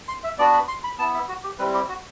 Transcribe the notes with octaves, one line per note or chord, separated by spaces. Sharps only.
C6
E5
B3 D4 F#4 D5
B5
C6
B5
B3 E4 A5
E5
F#4
G4
G3 C4 E4 B4
G4
F#4